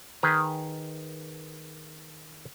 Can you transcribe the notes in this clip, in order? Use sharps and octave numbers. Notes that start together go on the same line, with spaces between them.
D#3 G#4 B4 A#5